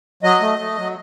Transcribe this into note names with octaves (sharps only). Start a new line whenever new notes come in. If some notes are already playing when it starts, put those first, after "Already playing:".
F#3 D#5
A3
A3
F#3